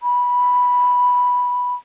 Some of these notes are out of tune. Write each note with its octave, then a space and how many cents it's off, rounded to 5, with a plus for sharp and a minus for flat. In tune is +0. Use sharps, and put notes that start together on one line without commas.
B5 -5